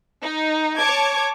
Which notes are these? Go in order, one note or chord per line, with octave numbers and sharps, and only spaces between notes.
D#4
C#5 A5 D6 G#6